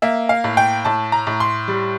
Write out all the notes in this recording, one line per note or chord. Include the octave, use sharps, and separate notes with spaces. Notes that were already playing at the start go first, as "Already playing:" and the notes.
A#3 E5
F5
A2
G5
A2 A5
A#5
A2
C6
G3